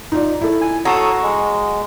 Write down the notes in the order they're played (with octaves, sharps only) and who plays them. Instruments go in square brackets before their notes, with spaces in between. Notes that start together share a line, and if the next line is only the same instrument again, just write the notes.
[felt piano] D#4 F4 D5
E4 A4
[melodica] G#5
[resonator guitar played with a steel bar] F#4 [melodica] A4 C#5 D#6 [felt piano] A#5 C7 E7
[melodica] G#3